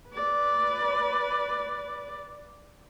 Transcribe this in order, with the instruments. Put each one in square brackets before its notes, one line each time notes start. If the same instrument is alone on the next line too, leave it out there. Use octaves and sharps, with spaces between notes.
[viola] B4 D5